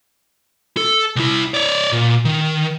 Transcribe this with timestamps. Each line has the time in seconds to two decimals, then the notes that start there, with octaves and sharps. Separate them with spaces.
0.77 A4
1.16 C2 E4
1.54 C#5 D5
1.92 A#2
2.25 D#3